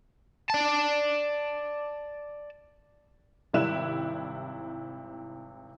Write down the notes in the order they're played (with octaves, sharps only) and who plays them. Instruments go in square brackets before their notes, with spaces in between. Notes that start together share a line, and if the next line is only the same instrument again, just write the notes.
[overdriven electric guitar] D5 A5
[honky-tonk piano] G#1 C3 G3 E4 F#6 E7